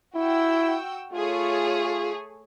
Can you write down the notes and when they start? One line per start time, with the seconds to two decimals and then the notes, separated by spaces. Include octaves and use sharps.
0.15 E4 F#4 G5 E6
1.13 A3 F4 G#4 C#5